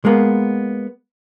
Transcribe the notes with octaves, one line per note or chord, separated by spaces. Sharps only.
G#3 A#3 B3